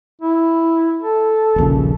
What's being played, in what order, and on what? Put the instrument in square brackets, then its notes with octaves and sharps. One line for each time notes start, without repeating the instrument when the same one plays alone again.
[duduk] E4
A4
[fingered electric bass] D#1 A#1 C#3